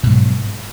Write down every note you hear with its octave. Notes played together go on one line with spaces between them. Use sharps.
G#2 B2 F#3